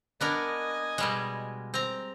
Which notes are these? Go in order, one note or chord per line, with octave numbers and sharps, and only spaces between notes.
B3 D4 A#4 D#5 G#5
B2 G3 G#3
C4 A#5